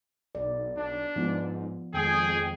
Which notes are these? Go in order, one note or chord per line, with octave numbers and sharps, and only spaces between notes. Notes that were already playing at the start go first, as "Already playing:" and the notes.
B1 D5
B1 D4
G#2 F3 B3 F4
F2 D#3 G#3 G#4 G5